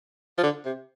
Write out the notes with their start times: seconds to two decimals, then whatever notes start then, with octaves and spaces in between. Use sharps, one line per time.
0.38 F3
0.43 D3
0.65 C3